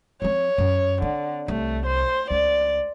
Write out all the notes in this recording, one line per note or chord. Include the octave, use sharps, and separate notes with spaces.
F3 C4 C#5
F#2
D3 C4
C2 A3
C5
C#2 D5